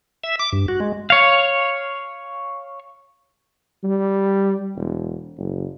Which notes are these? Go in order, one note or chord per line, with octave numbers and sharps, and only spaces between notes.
E5
D6
G2
F#4
G#3
C#5 F5
G3
E1
F#1